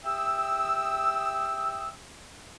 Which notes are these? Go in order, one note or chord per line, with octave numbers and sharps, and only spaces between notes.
G4 E5 G5 D#6 E6